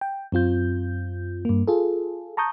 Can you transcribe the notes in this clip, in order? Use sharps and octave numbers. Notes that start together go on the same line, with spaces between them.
G5
F#2 C4 F4 G6
G2 A#3
F4 G#4 A4
A5 A#5 C#6 D#6 G6